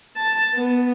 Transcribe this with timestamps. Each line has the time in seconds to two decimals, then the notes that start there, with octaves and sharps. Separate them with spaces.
0.16 A5
0.54 B3